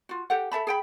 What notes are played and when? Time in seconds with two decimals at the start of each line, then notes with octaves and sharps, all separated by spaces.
0.09 F4 F#4
0.30 G4 A4 F#5
0.51 A4 E5 A5 B5
0.67 G#4 G5 B5